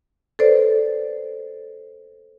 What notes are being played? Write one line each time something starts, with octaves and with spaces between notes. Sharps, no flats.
A4 B4 C5 D5